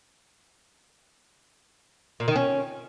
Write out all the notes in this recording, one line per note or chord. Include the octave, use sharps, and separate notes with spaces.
A#2
D#3
C#4